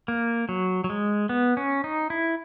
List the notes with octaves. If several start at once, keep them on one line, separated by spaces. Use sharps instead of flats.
A#3
F#3
F#3
G#3
B3
C#4
D#4
E4